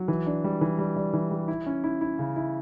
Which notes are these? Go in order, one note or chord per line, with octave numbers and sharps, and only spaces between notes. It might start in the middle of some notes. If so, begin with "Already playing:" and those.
Already playing: F#3
E3
D4
G3
E3
G3
G3
E3
G3
E4
C#4
E4
E4
C#3
E4